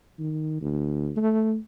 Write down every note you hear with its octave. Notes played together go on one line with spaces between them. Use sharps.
D#3
D2
A3